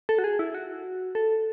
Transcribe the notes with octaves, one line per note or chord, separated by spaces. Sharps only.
A4
F#4
G#4
E4
F#4
A4